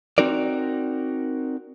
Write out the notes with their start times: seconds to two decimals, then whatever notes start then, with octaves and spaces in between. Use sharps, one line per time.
0.18 C4 D#4 F#4 A#4 D5